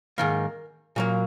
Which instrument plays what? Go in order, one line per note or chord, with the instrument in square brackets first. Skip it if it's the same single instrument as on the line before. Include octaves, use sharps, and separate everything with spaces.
[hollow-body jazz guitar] G#2 D#3 A#3 A#4
A#2 F#3 A#3